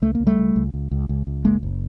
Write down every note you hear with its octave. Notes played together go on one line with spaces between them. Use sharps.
C#2 A3
A#3
C#2
G3 A3
C#2
C#2
C#2
C#2
C#2
C#2
F#1 G#3 A#3
F#1